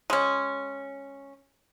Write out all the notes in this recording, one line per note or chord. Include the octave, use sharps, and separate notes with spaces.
G#3 C#4